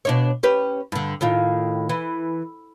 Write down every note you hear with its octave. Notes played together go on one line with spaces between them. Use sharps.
B2 D4 C#5
C#4 G4 B4
G2 D3
A2 D#3 F4
E3